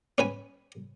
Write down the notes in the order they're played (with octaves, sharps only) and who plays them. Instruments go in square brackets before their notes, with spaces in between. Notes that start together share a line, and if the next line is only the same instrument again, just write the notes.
[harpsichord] C#4 B4 G#5